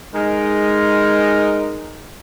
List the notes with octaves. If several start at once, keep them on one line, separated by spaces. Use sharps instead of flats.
G#3 D#4 A#4